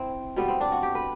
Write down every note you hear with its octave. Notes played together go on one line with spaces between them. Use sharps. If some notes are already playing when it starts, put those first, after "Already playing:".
Already playing: C4 E4
B2 G3 B3
C4
D4
F#4
G4
B4